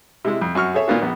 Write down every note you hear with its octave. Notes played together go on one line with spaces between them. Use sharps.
C3 G#3 E4
F2
F#2 F#4 C#6 F6
G#4 A4 C#5 E5
A#2 D#3 A#3 B3 F4 F#4
A#1 B3